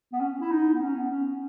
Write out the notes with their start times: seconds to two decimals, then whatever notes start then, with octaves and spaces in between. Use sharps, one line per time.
0.12 B3
0.21 C#4
0.41 E4
0.51 D#4
0.74 B3
0.81 C#4
0.96 B3
1.11 C#4